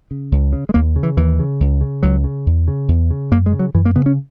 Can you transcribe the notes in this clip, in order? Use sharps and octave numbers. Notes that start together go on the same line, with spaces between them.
C#3
C#2
C#3
G#3
D#2 A#3
C#3
E3
D#2 E3
C#3
C#2
C#3
C#2 F#3
C#3
E2
C#3
E2
C#3
F#2 A#3
G#3
C#3
F#3
F#2 E3
A#3
C#3 B3
C#4